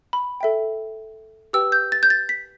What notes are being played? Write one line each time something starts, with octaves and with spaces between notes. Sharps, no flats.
B5
A4 E5 G5
G4 B4 G5 E6
G6
A6
G6
A6
B6